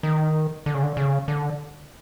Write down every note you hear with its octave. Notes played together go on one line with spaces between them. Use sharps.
D#3
D3
C#3
D3
C#3
D3